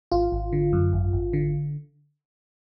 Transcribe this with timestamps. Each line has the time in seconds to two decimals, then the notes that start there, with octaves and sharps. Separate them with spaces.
0.12 G#1 F4
0.32 G#1
0.53 D3
0.73 F#2
0.93 G#1
1.13 G#1
1.33 D3